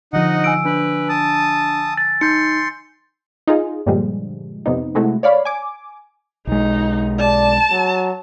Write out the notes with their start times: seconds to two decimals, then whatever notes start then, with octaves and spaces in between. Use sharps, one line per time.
0.13 D3 F3 D#4 D#5 F#5
0.44 G#5 E6 D7
0.65 D4 B4
1.09 A5 D#6
1.97 A6
2.21 D#4 C6 G6 C#7
3.48 D#4 F4 G#4
3.86 G2 A#2 D3 F3 G3 G#3
4.66 F2 C3 B3 D#4
4.95 C3 G#3 A3 E4 F#4
5.23 C#5 D5 F5 B5
5.45 G#5 D6
6.47 B1 G#3 D#4
7.20 D5 A5
7.71 F#3